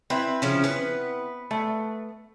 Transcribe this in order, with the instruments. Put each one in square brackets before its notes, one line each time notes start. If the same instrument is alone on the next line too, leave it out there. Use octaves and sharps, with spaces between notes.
[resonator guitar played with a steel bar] C4 E4 E5 [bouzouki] B4
[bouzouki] C#3 F3 C#4
B3 B4
[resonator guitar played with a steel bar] A3